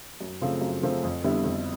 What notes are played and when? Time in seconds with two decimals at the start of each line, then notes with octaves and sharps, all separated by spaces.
0.20 F#2
0.41 C#3 F3 A3 C4
0.61 F#2
0.82 C#3 F3 A3 C4
1.04 F2
1.24 D3 G3 B3 E4
1.44 F2